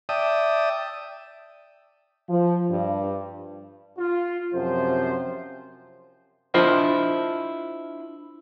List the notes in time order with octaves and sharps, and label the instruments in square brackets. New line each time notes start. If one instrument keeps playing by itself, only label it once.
[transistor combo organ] D5 E5 G5 A5 D#6
[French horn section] F3
G2
[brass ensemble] F4
F#2 C3 F3 C5
[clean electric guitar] D4 E4 F4 A#4 C5 D#5